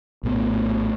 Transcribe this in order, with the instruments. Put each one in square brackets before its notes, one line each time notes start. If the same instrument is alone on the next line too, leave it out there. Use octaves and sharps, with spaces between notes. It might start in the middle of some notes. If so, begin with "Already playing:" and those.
[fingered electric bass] A#1 A2 B3